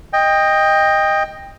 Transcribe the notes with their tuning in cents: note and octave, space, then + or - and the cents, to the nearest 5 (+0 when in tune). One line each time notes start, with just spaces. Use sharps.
D#5 +0 G5 +20